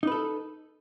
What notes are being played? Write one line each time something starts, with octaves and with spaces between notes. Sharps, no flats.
D#4 A4 B4